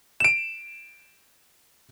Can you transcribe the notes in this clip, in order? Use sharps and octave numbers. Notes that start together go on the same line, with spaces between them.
D7 E7